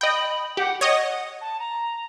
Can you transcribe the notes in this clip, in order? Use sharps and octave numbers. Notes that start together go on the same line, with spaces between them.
D#5 G5 B5
G4 F#5
C#5 D#5 F#5
A5
A#5